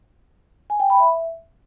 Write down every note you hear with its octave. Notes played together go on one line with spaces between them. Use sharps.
G#5
G5
B5
E5